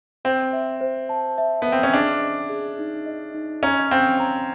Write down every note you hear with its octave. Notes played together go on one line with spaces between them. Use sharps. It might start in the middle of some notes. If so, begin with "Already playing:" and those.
C4 C5
E5
C5
A5
E5
B3 E5
C4
C#4
D4 G#4
D#5
G#4
D#4
D#5
D#4
C#4 A#5
C4 F5
A#5